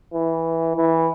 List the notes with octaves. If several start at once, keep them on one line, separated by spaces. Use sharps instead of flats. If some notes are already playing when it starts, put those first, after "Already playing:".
E3
E3